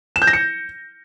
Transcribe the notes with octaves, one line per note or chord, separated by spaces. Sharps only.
E7
G6
A#6
C#7